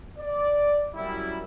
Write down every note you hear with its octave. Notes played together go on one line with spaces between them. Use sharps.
D5
F#2 G3 E4